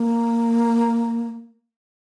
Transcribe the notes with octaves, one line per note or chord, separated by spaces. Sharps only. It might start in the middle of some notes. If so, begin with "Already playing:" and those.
Already playing: A#3